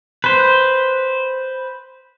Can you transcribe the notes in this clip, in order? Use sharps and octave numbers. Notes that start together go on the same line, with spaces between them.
B4 C5